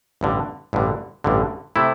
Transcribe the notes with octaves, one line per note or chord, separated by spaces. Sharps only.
A1 G2 D3
A1 G2 D3
A1 G2 D3
C3 A3 E4